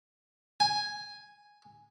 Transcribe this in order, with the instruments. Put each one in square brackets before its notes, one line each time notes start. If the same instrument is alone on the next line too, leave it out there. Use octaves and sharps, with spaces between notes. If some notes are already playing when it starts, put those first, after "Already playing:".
[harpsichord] G#5